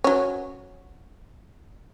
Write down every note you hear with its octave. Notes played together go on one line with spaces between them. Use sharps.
F#3 C#4